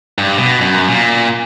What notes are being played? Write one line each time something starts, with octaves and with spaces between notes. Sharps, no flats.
G2
B2
F#2
A#2